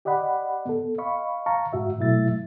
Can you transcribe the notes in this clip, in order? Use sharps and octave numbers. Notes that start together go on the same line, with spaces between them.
G4 D5 D#5 F#5 B5
B3 A4
D#5 F5 B5 C#6
F5 A5 A#5 C#6
G#2 F#4 E5
B2 F#3 A3 E4 E5 A6